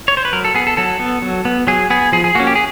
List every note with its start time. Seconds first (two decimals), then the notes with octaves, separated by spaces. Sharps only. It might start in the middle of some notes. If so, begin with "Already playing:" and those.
0.08 C#5
0.17 C5
0.25 B4
0.33 F#3 A#4
0.45 A4
0.55 B3 G#4
0.67 A4
0.77 F#3 A4
1.00 B3
1.22 F#3
1.45 B3
1.67 F#3 G#4
1.90 B3 G#4
2.12 F3 G#4
2.24 G#4
2.35 A#3 C#4 F#4
2.47 G4
2.55 G#4